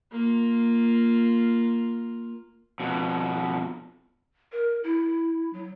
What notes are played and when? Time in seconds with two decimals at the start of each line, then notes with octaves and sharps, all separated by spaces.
0.12 A#3 F4
2.80 F2 B2
4.52 A#4
4.84 E4
5.53 F#3